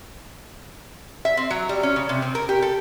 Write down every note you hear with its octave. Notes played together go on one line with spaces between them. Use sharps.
E5
C4
F#3
G3
C#4
C#3
C3
C4
A#4
G4
A4